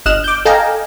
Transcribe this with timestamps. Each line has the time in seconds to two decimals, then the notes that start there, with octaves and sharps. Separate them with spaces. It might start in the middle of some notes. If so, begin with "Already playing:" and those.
0.06 G1 D#5 F6 F#6 E7
0.24 D6 G6
0.45 A4 D#5 F5 G5 G#5 A#5